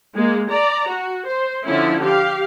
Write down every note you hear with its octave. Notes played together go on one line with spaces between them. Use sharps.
G#3 A#3
D5 A#5
F#4
C5
D3 F3 C#4 E4
G4 F5